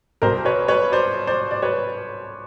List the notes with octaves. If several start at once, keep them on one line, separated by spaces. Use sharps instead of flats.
C2 B2 A#4 C5
B4 C#5
B4 C#5
C5 D5
C5 D5
D5
B4 C#5